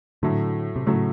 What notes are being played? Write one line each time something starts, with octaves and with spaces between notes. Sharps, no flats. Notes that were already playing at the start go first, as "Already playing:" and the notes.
A2 D3 F#3 A3
C3
A2 C#3 F#3 A3